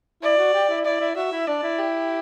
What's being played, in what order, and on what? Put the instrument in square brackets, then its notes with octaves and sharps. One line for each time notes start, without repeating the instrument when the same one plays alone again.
[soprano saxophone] E4 [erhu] D5
[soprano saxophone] F#4
G4
E4
[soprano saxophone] E4 [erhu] D5
[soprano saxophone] E4
[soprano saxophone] F#4 [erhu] E5
[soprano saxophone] E4
[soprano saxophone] D4 [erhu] D5
[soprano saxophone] E4
[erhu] G4